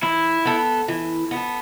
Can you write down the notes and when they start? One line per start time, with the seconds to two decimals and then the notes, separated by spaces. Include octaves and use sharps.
0.02 E3 E4
0.45 B3 A4
0.88 E3
1.31 B3
1.36 A4